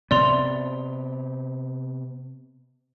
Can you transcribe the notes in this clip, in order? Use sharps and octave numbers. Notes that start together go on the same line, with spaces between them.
C3 B3 D5 C6 F7